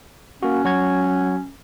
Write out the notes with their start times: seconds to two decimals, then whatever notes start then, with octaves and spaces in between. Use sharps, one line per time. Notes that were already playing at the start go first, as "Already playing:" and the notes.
0.43 A#3 C#4 F#4
0.65 F#3 F#4 G#6